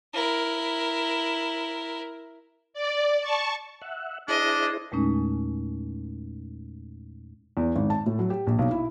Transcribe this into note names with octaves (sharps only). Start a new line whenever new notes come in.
E4 A#4
D5
A5 C#6
E5 F#5
D4 E4 G#4 C5 D#5
E2 A#2 G#3 A3 C#4 D#4
E2
G#1
A5
A2
F#3
G4
A#1
B1
E4